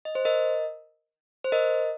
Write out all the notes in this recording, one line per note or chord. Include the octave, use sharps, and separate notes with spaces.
D#5
C5
A#4 D#5
C5
A#4 D#5